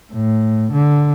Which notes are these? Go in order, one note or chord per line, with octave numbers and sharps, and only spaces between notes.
A2
D3